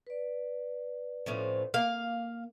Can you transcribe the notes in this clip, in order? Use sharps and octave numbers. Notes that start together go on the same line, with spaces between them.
B4 D5
A2 F3 C#4
A#3 F5